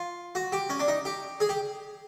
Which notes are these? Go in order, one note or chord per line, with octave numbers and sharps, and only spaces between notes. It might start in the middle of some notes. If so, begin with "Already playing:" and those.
Already playing: F4
F#4
G4
C#4
D4
D#4
G4
G#4
G4